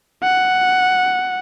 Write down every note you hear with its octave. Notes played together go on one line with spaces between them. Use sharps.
F#5